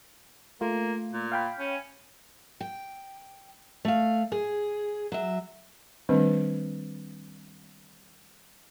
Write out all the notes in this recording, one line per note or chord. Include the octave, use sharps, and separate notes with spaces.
A3 A#3 F4
A#2
F5 G5 B5
C#4
G5
A3 F5
G#4
F#3 E5
D#3 G3 A3 C4 D4 B4